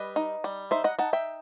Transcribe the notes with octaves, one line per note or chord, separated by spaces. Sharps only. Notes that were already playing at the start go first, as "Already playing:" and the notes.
Already playing: G3 B4 D#5
D#4
G3
D#4 C5 E5
D#5 F#5
D#4 F#5 A5
E5 G5